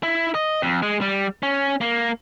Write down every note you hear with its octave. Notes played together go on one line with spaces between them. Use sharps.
E4
D#5
F2
G#3
G3
C#4
A#3